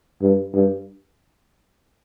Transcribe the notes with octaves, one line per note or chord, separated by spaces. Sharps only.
G2
G2